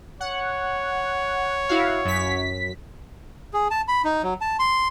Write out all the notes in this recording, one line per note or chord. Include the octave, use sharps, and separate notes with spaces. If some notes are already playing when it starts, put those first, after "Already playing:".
C#5 F#5
E4 F#4 F5
F#2 B6
G#4
A5
B5
D#4
F#3
A5
C6